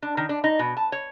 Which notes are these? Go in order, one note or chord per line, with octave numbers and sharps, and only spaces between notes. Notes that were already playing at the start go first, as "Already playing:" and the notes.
D4
D#3
D4
D#4
B2
A5
C#5